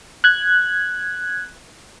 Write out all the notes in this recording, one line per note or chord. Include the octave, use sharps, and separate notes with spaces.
F#6 G#6